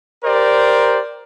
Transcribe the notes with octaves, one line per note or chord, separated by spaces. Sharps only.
G4 A#4 C5 D5